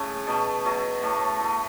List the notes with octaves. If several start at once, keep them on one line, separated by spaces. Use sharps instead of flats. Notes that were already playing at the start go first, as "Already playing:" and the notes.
Already playing: A2 C#3 A3 A5
B2 A3 A5
B2 F#3 A3
A2 A3 A5
A2 A3